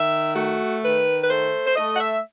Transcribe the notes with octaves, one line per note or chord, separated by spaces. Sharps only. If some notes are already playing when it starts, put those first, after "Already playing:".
Already playing: D#3 E5
A3 F#4
D#3 B4
B4
A3 C5
C5
A3 D#5
F#5
E5